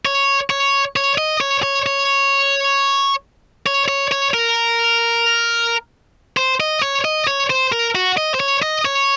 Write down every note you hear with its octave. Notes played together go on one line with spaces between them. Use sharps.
C#5
C#5
C#5
D#5
C#5
C#5
C#5
C#5
C#5
C#5
A#4
C5
D#5
C#5
D#5
C#5
C5
A#4
F#4
D#5
C5
C#5
D#5
C#5